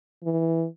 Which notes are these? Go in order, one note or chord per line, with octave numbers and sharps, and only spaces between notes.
E3